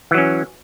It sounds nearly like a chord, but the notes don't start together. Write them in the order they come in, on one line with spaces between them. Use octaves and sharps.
E3 F#3 C#4